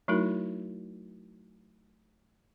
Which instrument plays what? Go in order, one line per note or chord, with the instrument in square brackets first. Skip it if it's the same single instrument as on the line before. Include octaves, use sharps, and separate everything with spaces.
[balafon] F#3 A3 D#4 E4 F#4 A#4